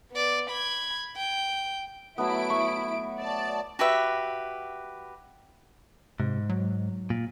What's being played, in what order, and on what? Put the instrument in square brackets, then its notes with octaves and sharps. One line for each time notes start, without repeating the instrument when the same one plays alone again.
[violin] B3 D5
B5 G#6
G5
[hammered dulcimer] F#3 A3 B3 [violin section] E4 D7
[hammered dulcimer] C#6
[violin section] D5 A5
[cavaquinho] F#4 G4 B4 E5
[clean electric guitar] G#2 [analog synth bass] C3
[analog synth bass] F#3
[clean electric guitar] A#2